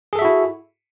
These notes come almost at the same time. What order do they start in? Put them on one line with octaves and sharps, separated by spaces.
G#4 A4 E5 F#4 E4